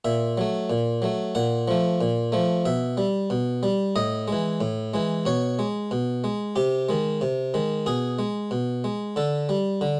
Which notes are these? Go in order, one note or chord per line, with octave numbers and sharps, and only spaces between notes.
A#2 E5
F#3 A3
A#2
F#3 A3
A#2 F#5
F3 A3
A#2
F3 A3
B2 E5
G3
B2
G3
A2 D#5
E3 G#3
A2
E3 G#3
B2 C#5
G#3
B2
G#3
C3 G4
D#3 G#3
C3
D#3 G#3
B2 G#4
G#3
B2
G#3
D3 A4
G3
D3